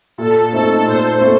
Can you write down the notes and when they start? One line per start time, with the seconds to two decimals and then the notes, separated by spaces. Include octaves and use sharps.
0.18 A#2 A4
0.51 A3 C4 D#4 A4
0.85 A#2 C5
1.19 A3 C4 D#4